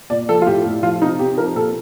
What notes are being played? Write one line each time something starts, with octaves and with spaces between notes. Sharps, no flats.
A#2 D5
F3 A4
F4
A2 G4
A2
F3 F4
C3 D#4
C3 G4
F3 A#4
A#2 A4